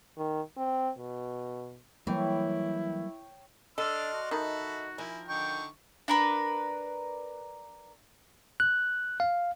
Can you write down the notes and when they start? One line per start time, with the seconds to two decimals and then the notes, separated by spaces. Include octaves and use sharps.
0.17 D#3
0.57 C4
0.98 B2
2.07 E3 F#3 G3 A#3 E4 C#5 G5 C#6
3.78 D4 A4 D5 D#5 C6 F6
4.13 F#4
4.31 D#3 A4 E5 B5
4.98 F3 E4 A#4 G#5
5.28 D3 D#4 G5 C#6
6.08 D4 A#4 B4
8.60 F#6
9.20 F5